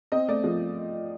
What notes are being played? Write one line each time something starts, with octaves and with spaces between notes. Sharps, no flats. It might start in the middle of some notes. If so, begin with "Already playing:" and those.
C4 D#5
A3 D5
F3